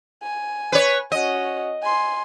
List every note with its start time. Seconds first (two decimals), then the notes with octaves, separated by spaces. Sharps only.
0.23 G#5
0.72 B4 C#5
1.12 C#4 F#4 D#5
1.83 G#5 C6